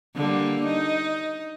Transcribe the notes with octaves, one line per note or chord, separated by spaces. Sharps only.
D3 G3 A#3
D#4